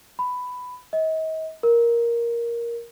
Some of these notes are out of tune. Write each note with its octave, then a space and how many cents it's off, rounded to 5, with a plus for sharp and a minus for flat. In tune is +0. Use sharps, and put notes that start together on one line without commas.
B5 +10
D#5 +40
A#4 +5